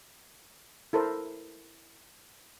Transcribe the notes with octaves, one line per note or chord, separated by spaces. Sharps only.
E4 A4 A#4 C5